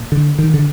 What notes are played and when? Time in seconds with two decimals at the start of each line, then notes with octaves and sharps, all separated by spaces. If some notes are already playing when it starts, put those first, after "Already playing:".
Already playing: A#2
0.12 D3
0.39 D#3
0.54 D3